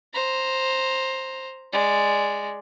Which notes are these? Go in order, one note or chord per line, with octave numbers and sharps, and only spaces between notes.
C5 A#5
G#3 D5